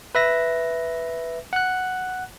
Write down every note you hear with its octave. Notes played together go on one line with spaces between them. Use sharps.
B4 E5 A#6
F#5 F#6